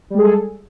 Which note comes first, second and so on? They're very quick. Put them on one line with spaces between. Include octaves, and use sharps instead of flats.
G3 G#3 G#4 A4